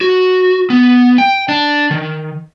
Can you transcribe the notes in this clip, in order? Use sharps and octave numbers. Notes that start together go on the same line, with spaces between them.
F#4
B3
G5
D4
D#3